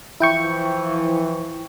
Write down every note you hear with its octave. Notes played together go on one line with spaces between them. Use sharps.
E3 F3 E4 G5 C#6